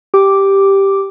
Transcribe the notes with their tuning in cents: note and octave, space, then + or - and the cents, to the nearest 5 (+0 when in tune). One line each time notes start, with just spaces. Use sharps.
G4 +0 D6 +0